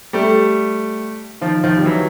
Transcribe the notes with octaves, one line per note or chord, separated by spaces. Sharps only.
G3 A3
D#3 F3
D#3 F3
G3
E3 F#3